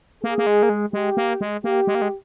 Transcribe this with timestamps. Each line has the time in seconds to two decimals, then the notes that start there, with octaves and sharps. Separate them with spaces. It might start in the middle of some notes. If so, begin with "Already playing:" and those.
0.23 A#3 G#4
0.38 A#3
0.47 G#3
0.63 A#3
0.69 G#3
0.93 G#3 G4
1.17 A#3
1.41 G#3
1.64 A#3 G4
1.87 G#3
1.95 A#3
2.02 G#3